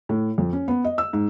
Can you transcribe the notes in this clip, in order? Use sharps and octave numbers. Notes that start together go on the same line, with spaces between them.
A2
F2
C#4
B3
D#5
E6
G#2